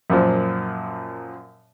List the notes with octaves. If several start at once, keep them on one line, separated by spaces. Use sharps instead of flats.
F#2 A#2 F3